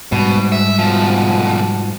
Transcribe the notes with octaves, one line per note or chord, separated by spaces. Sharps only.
G#2 B2 G3
E5
B2 F3